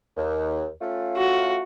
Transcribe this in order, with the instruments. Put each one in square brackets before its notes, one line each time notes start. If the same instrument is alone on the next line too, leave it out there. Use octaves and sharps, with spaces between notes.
[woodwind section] D#2
A3 C#4 F4
[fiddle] F#4